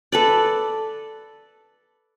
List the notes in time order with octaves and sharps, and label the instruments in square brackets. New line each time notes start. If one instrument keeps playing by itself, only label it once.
[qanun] A4 B4 D5